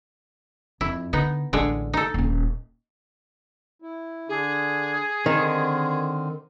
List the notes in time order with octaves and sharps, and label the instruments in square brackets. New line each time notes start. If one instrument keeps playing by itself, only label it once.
[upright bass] F2 [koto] E4
[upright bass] D3 [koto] B3 D#4
[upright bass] A1 [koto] D3 G#3
[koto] D#4 A4
[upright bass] D#1 C#4
[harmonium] E4
[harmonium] D3 D4 [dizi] G#4
[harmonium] D3 C4 [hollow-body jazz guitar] D#3